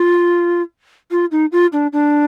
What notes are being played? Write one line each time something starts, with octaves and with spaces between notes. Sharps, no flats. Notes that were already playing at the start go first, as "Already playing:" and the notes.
Already playing: F4
F4
D#4
F4
D4
D4